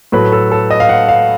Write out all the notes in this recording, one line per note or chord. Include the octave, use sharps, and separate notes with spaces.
A2 F#3 A3 B4
A4
A4
D#5
F5
F#5
F5